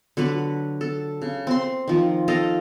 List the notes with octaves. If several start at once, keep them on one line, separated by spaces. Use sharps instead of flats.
D3 F#3 B4
A4
C#3
C4 C6
D#3 F3
A4 D#5 F5 G5